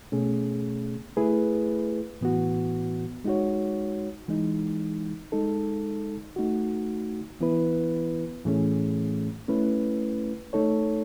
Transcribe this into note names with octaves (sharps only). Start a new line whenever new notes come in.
B2 A3 C#4 G#4
A3 E4 G#4 B4
A2 E3 B3 F#4
G#3 D#4 F#4 C#5
E3 G#3 D#4
G#3 D#4 A4
A3 D#4 F#4
E3 B3 E4 B4
A2 E3 A3 C#4 G#4
A3 C#4 E4 B4
A3 D#4 A4 C#5